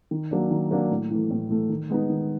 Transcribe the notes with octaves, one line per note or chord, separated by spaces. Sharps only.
D#3
F#3 A#3 D4
D#3
F#3 A#3 D4
A2
E3 A3
A2
E3 A3
D#3
G#3 B3 D#4
D#3